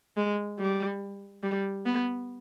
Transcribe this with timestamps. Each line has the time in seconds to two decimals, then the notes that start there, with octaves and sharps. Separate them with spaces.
0.17 G#3
0.59 G3
1.43 G3
1.86 B3